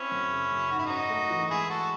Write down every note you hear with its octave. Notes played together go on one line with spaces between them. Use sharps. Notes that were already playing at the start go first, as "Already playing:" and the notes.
Already playing: C4 C#4 E4
F#2
C#3
F#2
G#2 F#4
E4
C#4 D#4 F#4
A3
E3
F#4
G#3 E4 G#4
G#3 F#4 A4